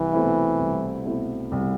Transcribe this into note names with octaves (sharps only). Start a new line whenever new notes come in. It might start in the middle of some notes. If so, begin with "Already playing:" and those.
Already playing: C2 E3
B2 A3 C4 E4
C2
B2 A3 C4 E4
C2